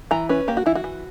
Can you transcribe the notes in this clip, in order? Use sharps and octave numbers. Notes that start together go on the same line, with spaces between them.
E3 A#5
C#4 B4
A#3 G4
F#4
E3 E4
F#4
E3